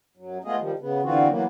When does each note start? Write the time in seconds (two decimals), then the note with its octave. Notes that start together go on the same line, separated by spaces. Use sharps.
0.17 F#2 F#3
0.44 G#3 A3 B3 F4 G#4 D#5
0.59 D#3 F3 G3
0.79 C#3 B3
1.03 D3 E3 B3 C4 F4 F#4
1.28 E3 F#3 A#3 B3